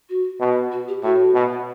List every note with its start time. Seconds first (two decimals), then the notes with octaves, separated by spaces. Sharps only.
0.09 F#4
0.40 B2
0.72 F#4
0.88 G4
1.03 A2 F#4
1.34 B2